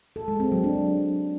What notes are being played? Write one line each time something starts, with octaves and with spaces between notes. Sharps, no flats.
A4
G#3
C4
F#3
D4